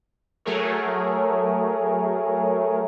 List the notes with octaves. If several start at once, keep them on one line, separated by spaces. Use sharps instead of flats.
F#3 A3 G#4 A#4 C#5